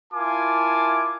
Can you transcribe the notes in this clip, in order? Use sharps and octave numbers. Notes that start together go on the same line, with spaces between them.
E4 F4 A#4 G#5 A5 D6